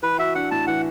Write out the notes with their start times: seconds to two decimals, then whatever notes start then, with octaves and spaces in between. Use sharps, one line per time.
0.02 E3 B4
0.19 F#4 E5
0.35 D4 F#5
0.51 A2 A5
0.67 E3 F#5